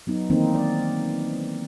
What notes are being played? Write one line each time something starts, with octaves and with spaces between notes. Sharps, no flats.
F#3 B3 D#4
D#3 E3 A#3 C4 D#4
A#4 D5